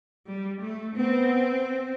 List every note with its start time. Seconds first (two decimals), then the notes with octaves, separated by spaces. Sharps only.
0.27 G3
0.61 A3
0.96 B3 C4